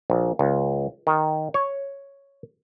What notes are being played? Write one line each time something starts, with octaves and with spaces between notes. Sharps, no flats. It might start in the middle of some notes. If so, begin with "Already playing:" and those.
A#1
C#2
D#3
C#5